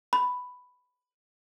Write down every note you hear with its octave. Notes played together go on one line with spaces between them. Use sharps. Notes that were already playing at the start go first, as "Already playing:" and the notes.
B5